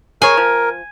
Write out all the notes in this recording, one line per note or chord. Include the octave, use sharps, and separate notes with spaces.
G#4 A#4 C#5 G#5
F3